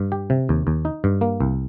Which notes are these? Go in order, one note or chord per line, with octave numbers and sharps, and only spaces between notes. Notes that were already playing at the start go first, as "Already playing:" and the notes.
Already playing: G2
G4
C3
D#2
D#2
D#4
G2
A#3
C2